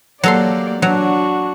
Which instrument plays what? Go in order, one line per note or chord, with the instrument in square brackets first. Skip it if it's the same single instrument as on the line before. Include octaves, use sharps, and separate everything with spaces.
[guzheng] F#3 A4 C6 [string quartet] A#3 G4 D5
[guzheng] F#3 [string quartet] D4 F#4